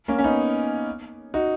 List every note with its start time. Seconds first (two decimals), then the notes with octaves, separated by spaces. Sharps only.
0.08 A#3 C#4
0.19 C#4
0.24 B3 D#4
1.34 D#4 F#4